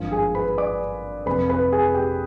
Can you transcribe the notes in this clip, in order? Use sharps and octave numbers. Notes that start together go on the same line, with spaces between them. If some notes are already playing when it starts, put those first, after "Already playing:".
Already playing: G#1 G2 F3
G#4 G#5
B4 B5
D5 D6
F2 C3 F3 B4 B5
B4 B5
G#4 G#5
G4 G5